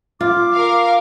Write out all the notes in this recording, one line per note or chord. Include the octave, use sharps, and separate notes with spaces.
F4 D6
A#4 F5